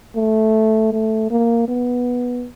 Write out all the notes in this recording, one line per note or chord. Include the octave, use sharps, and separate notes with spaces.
A3
A3
A#3
B3